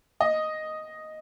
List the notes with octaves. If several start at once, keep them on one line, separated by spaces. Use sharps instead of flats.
D#5